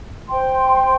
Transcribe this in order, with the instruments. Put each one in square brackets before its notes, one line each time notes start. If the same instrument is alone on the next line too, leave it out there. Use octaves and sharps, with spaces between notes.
[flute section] C5 G5 C6